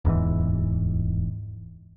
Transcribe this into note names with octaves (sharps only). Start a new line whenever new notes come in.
D1 E2 G#2 E3